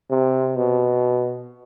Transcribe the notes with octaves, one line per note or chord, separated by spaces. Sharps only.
C3
B2